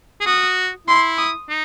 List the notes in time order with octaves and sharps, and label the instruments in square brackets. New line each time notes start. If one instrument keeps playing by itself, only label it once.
[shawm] G#4
[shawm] F#4 [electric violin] D#6
[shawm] E4 [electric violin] C6
[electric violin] D#6
[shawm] D#4